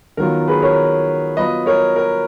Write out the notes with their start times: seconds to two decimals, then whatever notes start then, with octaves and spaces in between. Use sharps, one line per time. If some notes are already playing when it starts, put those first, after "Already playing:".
0.17 D#3 F#3 B3 F4 A#4
0.48 G#4 B4
0.62 A#4 C#5
1.36 F#3 B3 F4 B4 D#5
1.66 A#4 C#5
1.96 A#4